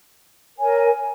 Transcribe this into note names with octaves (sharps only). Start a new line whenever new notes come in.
A#4 C#5 G#5